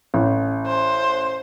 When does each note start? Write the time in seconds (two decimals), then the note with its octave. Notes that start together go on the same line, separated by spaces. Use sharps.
0.14 A1
0.67 C5